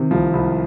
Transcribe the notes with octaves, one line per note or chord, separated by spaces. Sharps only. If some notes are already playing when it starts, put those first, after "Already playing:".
Already playing: C3 D#3
C2 F3
C2